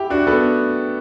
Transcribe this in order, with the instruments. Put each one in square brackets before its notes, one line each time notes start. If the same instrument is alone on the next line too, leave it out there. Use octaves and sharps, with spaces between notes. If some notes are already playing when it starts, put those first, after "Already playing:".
Already playing: [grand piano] E4 [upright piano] G4
[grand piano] D4 [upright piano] F#4
[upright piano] B3 [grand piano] A4